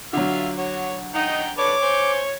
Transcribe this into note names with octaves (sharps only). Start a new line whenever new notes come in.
D3 F#3 F4 E5 F5
F#4 C#5
D#4 F#5 G5 A#5
A4 B4 C#5 D5 D6
C5 G#5